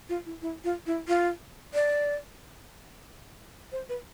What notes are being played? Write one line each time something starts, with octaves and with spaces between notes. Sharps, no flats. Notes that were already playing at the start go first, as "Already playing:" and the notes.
F4
E4
E4
F4
E4
F4
D5
C5
B4